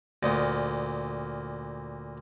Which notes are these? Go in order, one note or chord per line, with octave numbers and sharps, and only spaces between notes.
D2 A#2 D#5